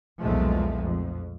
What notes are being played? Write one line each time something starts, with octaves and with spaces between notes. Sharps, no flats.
B1 E2 A#2 F3 G#3 A3
F2